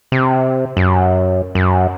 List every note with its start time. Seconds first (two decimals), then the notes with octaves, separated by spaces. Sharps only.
0.12 C3
0.77 F#2
1.55 F#2